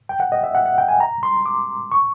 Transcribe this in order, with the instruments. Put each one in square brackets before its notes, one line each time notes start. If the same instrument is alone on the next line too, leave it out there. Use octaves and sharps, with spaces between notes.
[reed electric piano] G5
F#5
D#5
E5
F#5
F#5
G5
G#5
A#5
C6
D6
C#6